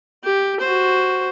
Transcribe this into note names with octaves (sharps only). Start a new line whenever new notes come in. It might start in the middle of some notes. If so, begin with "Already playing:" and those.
G4
F#4 C5